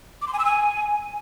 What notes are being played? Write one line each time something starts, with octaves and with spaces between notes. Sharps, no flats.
D6
C6
G#5
E6
G#5